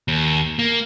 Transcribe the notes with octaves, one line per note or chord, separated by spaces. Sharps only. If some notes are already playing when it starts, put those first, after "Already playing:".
D#2
A#3